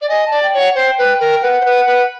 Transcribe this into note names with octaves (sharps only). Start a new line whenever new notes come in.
D5
D#5 G#5
A5
D5
G5
C#5 F#5
C5 G5
B4
A#4
B4 F#5
C5
B4
B4